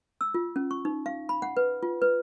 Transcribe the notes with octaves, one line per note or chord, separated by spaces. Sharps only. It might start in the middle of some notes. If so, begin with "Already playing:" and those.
E6
F4
C#4
C#6
D#4
F5
B5
F#5
B4
F4
B4